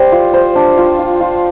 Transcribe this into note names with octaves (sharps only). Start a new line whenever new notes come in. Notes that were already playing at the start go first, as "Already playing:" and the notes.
Already playing: G3 C5
F4
C5
D4
F4
F4
F4